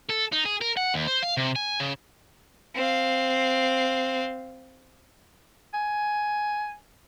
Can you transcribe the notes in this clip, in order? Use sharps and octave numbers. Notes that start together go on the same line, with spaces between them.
A4
D#4
G#4
A#4
F#5
D#2
C5
F5
C3
G#5
C#3
C4 F5
G#5